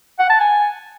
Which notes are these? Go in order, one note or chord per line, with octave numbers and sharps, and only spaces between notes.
F#5
A5
G#5